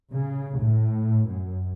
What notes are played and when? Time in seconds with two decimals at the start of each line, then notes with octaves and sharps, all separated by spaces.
0.11 C#3
0.56 A2
1.26 F#2